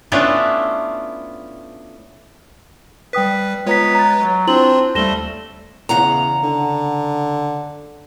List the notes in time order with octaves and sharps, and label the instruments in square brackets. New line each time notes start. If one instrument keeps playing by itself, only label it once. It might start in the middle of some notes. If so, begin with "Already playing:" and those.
[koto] A3 B3 C#4 D4 E4 F4
[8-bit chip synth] G3 B4 [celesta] G5 D#6 B6
[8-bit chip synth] G#3 B4 C#5 [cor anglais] B3 [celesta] F4 A#5 B6
[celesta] A#5 A6
[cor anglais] F#3
[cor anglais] C4 [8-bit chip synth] D4 F4 [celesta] E4 C5 F#7
[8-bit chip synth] D#2 G3 A3 [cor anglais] A4 [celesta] A#6 E7 G7
[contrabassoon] E2 [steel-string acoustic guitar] C#3 F#5 A#5
[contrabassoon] D3